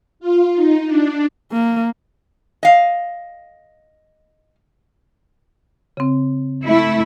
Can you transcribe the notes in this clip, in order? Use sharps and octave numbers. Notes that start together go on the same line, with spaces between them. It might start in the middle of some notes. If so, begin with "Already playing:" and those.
F4
D#4
D4
A#3
D#5 F5
C#3 C4
A3 E4